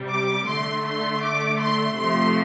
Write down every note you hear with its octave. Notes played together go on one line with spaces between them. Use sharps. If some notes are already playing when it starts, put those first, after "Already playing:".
Already playing: C3 G3
D6
D3 A3 C6
C6
D6
C6
C3 F3 A3 C6